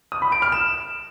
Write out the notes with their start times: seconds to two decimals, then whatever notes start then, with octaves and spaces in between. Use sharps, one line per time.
0.12 D#6
0.22 B5
0.32 D7
0.42 F6
0.52 E7